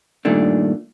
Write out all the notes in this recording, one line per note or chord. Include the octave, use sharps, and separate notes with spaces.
G2 A#2 D#3 A3 D4